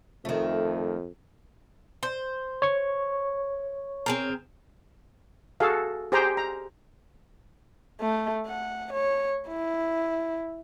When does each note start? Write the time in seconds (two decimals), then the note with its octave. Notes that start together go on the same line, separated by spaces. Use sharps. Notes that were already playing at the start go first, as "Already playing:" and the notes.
0.25 F2 D#3 A3
2.03 C5
2.62 C#5 C#6
4.06 C4 G#4 A#4
5.60 F#4 G#4 A4 F5
6.12 G4 G#4 C5 G5 G#5 A#5
6.37 A#5
8.00 A3
8.47 F#5
8.93 C#5
9.48 E4